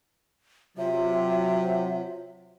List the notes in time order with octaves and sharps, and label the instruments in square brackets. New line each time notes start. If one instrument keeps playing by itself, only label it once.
[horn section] C3 [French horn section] F#3 [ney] F4 [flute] E5